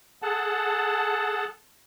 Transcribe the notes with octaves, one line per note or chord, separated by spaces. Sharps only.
G#4 A4 F#5 A5